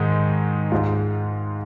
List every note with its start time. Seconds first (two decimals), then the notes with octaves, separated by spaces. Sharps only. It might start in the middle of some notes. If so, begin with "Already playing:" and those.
Already playing: G#2 D#3 G#3
0.72 G#2 G#3 F4